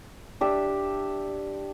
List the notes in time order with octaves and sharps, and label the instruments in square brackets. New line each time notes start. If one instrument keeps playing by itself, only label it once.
[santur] D4 G4 E5